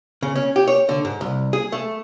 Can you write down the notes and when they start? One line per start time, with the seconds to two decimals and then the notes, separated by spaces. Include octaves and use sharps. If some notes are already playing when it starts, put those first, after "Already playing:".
0.22 C#3
0.35 C#4
0.56 G4
0.67 C#5
0.89 D3
1.05 G#2
1.21 C2
1.53 G#4
1.72 A3